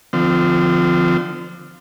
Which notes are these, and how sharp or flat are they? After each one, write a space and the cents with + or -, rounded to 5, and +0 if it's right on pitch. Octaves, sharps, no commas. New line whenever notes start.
D3 +25 F3 +0 C4 -30